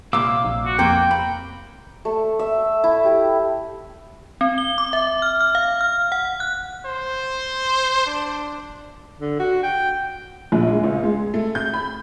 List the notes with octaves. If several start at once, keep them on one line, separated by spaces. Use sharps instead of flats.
C2 A#2 F5 D6 E6
A#1
F#4
F2 A#3 C4 G5
B5
A3
E5
E4
G4
C4
G7
D6
E5
F6
F6
F5
F6
F#5
F#6
C5
D4
D3
F#4
G5
A#1
G#3
C#2
G#3
A3
G6
B5